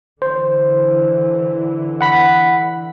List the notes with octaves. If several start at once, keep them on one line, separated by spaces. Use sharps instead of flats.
D3 E3 C5
F#5 B5 B6